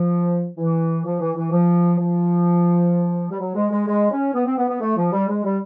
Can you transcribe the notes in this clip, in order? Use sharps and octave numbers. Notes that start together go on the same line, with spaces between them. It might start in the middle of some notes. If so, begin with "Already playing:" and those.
Already playing: F3
E3
F3
E3
E3
F3
F3
G3
F#3
G#3
G#3
G#3
C#4
B3
C4
B3
B3
A3
F3
G3
G#3
G3